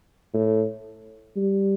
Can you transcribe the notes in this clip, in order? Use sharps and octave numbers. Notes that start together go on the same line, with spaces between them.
A2
G3